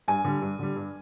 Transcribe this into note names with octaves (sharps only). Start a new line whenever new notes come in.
G2 G#5
D3 G3
G2
D3 G3
G2